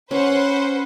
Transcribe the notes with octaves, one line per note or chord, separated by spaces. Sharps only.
C#4 B4 C5 F#5